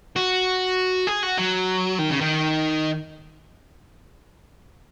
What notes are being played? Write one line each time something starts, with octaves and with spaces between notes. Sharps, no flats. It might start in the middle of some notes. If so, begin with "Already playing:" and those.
F#4
G#4
F#4
F#3
D#3
C#3
D#3